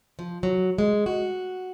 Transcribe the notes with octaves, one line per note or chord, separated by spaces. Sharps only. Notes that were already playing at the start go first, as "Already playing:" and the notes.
F3
F#3
G#3
F#4